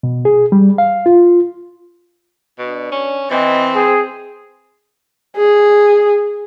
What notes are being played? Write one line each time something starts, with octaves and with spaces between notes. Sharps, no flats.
B2
G#4
G3
F5
F4
B2 D4
C#4
E3 C4 D#5
G#4 G5
G#4